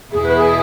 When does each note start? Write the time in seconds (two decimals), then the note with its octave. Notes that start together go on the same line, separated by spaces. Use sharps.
0.11 E2 B2 B3 E4 G#4
0.24 B4
0.36 G#4